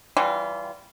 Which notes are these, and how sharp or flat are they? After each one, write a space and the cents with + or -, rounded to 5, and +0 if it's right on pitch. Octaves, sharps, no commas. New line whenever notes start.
E3 +0 G3 -25 F4 -25